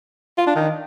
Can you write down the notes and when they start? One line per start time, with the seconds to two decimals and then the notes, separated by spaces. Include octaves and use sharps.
0.38 F4
0.47 D4
0.56 D#3